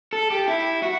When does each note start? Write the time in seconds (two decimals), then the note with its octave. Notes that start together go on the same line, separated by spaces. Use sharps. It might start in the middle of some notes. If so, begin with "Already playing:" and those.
0.13 A4
0.30 G4
0.48 E4
0.82 F#4